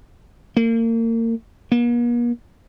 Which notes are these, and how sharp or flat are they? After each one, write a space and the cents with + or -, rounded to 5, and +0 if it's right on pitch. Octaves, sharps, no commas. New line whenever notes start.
A#3 -35
A#3 +45